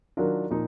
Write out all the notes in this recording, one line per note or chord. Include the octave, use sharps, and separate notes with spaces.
D#3 F#3 D4 F4 A#4
A#2 F3 A#3 D#4